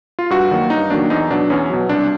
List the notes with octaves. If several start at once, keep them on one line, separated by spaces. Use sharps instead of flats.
F4
G2 F#4
D#3 F#3 A#3
G2 D#4
D#3 F#3 A#3 D4
E2 D#4
B2 F#3 D4
E2 C#4
B2 F#3
C2 D4